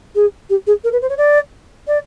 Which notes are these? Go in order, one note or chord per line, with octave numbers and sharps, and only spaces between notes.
G#4
G4
G#4
A#4
B4
C5
C#5
D5
D5